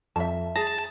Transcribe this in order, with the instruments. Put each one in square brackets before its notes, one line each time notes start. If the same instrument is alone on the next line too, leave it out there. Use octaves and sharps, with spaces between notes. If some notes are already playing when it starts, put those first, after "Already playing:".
[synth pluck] F2 [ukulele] E5 A5
[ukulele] G#4 [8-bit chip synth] A5 [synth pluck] A#6